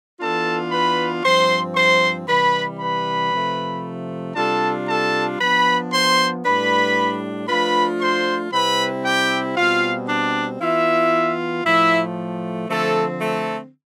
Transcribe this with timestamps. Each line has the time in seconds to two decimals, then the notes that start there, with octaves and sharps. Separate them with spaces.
0.19 E3 B3 D4 F4 A4 A5
0.71 B4 B5
1.23 G2 F3 C4 C5 C6
1.75 C5 C6
2.28 C3 E3 G3 B4 B5
2.80 B4 B5
3.32 C3 F3 A3
4.36 C3 G3 D4 F4 A4 A5
4.88 A4 A5
5.40 F3 B3 D4 B4 B5
5.92 C5 C6
6.44 A2 G3 D4 B4 B5
7.48 F3 A3 D4 F4 B4 B5
8.00 C5 C6
8.52 C3 G3 C4 E4 B4 B5
9.04 G4 G5
9.56 B2 G3 C4 F4 F5
10.08 D4 D5
10.60 E3 B3 E4 F4 E5
11.65 A2 F3 A3 E4 E5
12.69 D3 F3 A3 C4 A4
13.21 A3 A4